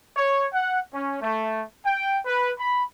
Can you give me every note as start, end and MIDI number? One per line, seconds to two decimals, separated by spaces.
0.15 0.46 73
0.53 0.79 78
0.92 1.18 61
1.21 1.62 57
1.84 2.18 79
2.24 2.51 71
2.58 2.83 83